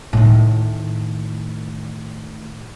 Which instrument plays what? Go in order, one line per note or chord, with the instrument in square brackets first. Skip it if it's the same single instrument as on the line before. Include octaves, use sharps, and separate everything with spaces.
[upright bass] A2 D#3